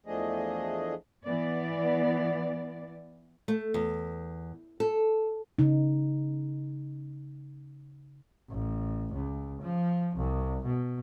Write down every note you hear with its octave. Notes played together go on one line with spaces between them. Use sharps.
E2 F3 A3 D4 G#4 D#5
E3 B3 D5
A3
E2
A4
C#3 D#4
A1
C#2
F3
C2
B2